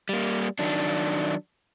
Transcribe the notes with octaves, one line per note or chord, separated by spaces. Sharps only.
G3 A#3
D#3 F#3 D4